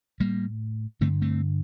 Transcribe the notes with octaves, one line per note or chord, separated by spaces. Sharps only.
A2 G3 A#3
G2 D3 A3 C4
A3 C4